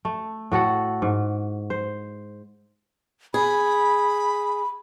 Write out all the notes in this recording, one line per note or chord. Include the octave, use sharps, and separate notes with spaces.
A3
A2 F#4 A4 F#5
G#2
C5
G#4 B5